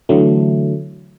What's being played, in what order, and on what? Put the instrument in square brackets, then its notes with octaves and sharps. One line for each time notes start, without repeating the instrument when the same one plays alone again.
[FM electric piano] D3 E3 F#3 A3